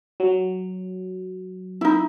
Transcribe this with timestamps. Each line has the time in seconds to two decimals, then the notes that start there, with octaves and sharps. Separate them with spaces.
0.20 F#3
1.81 D#4 E4